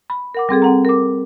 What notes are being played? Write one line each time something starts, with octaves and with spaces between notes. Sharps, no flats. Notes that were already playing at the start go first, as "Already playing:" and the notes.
B5
A#4 F#5 D6
G3 C4 G#4 A4
C4 F#5 A#5
A#4 D6